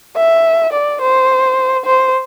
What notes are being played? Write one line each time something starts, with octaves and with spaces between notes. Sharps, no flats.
E5
D5
C5
C5